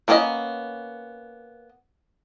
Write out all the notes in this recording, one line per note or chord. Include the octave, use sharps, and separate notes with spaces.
A#3 B3 C#4 G#4 D#5